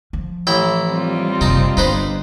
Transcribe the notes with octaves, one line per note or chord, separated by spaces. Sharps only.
F3
A1 E4 G5
G3 C4 F4
F#1 C3 D#4 A5
G1 D4 D#4 B4 C5